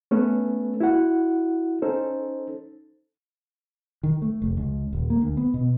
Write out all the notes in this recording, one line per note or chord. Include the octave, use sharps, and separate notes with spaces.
A3 B3 C#4 A4 B4
E4 F#4 F#5
C#4 D#4 A4 C5
D#3
A3
F1
C#2
D#1
A#3
D2
B3
B2